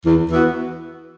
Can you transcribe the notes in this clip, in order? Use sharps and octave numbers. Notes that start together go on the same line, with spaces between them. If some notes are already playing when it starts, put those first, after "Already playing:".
E2
E3 B3 F#4